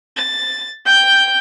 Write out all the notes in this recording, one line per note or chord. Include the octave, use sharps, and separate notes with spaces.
A6
G5 G6